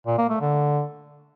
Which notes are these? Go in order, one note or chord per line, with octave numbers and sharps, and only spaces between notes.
A#2
A#3
A3
D3